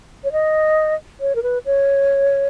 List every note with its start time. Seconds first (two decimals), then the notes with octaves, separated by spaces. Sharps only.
0.24 C#5
0.32 D#5
1.21 C#5
1.35 A#4
1.43 B4
1.66 C#5